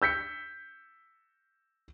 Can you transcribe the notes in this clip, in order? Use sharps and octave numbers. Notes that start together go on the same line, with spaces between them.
E6 G6 B6 C#7